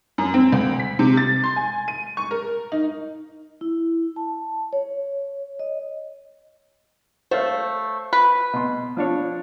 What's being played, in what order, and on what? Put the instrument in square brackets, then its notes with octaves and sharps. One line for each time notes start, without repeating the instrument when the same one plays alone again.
[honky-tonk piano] F#2
C4
D2
B6
C3
A6
C6
G#5
D#7
C#6
A#4
D#4
[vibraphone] E4
A5
C#5
D#5
[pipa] A3 [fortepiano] C5 C#5 F5
[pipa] B4
[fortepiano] B2 C6
F3 D4 C#5